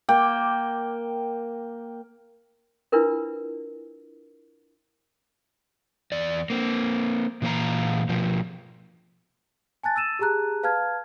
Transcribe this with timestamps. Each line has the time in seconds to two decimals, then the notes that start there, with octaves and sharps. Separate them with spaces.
0.09 A#3 G5
2.92 D4 E4 F4 A#4 B4
6.12 E2 D5
6.50 A#3 C4
7.42 A#2 E3 A#3 C5 F5 A#5
8.09 B2 F3
9.83 G#5 A5 F#6 A6
9.96 E6 A6 D#7 E7
10.19 G4 G#4 A5 A#5 F#6
10.63 B4 F5 A5 F6 G#6